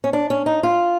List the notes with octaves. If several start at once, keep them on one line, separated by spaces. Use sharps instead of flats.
C#4
D4
C#4
D#4
F4